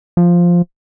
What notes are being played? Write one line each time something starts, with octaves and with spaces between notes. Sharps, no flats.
F3